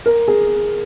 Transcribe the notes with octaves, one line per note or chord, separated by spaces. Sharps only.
A#4
G#4